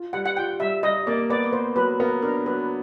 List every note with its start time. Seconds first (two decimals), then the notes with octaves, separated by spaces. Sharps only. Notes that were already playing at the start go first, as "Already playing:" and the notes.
Already playing: F4
0.13 G3 F#5
0.26 F#5
0.37 F4 G5
0.60 G3 E5
0.83 G3 D#5
1.07 A#3 D5
1.30 B3 D5
1.53 B3 C5
1.76 F#3 B4
2.00 B3 A#4
2.22 D4 A#4
2.46 F#3 B4